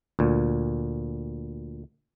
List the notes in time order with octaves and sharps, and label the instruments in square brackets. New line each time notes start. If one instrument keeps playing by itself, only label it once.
[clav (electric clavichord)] D2 A#2